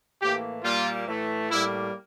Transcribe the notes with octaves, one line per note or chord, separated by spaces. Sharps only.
A2 E3 A#3 G4
A#2 G3 A#3 F4
A2 E3 A3
A2 G3 A#3 E4